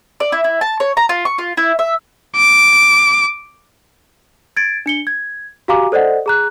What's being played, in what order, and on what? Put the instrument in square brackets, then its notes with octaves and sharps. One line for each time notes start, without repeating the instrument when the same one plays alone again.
[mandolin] D5
E4
E4
A5
C#5
A#5
F4
C#6
F4
E4
E5
[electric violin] D6
[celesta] G#6 A6 D7
D4 C#7 G7
G#6
F#4 G4 F5 G#5 A#5 D6
A4 C5 D5 D#5 F#5
G#4 A#5 F#6